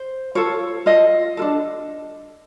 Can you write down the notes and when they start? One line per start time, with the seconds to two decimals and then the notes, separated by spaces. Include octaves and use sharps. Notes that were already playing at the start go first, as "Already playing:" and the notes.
Already playing: C5
0.35 F4 A4 C#5
0.86 F4 A4 D#5
1.37 F4 A4
1.42 D4